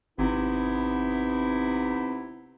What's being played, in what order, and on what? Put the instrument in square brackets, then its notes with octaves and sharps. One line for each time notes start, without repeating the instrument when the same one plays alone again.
[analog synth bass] G#1 [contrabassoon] C3 [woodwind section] B3 D#4 E4